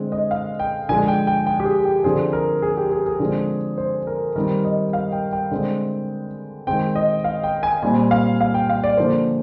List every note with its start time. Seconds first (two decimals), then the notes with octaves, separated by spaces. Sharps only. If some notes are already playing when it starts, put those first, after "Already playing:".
Already playing: D3 G#3 C4
0.12 D#5
0.31 F5
0.59 G5
0.89 D3 F3 G#3 G#5
1.08 G5
1.27 G5
1.46 G5
1.60 G4
1.65 G#4
1.85 G4
2.04 D3 F3 C4 G#4
2.33 A#4
2.62 G#4
2.77 G4
2.92 G#4
3.06 G#4
3.19 D3 F3 G#3 C4
3.78 C5
4.07 A#4
4.36 D#3 G3 C4 A#4
4.65 D#5
4.93 F5
5.12 G5
5.32 G5
5.51 D3 G#3 C4
6.67 D#3 G#3 C4 G5
6.95 D#5
7.24 F5
7.44 G5
7.63 G#5
7.82 A#2 G3 C4 G#5
8.11 F5
8.41 F5
8.54 G5
8.69 F5
8.84 D5
8.97 D3 F3 A#3 C5